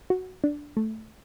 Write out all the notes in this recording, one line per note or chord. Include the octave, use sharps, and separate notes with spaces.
F#4
D4
A3